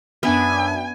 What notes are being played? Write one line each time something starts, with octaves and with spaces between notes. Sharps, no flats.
F#2 B3 D4 E5 G#5